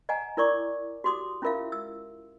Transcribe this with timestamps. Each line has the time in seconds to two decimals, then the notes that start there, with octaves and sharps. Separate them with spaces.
0.09 D#5 F#5 G#5 A#5
0.37 E4 A#4 D5 C#6 D6
1.04 F#4 G4 C6 D6 D#6
1.42 C#4 E4 F4 A#4 E5 F5
1.72 E6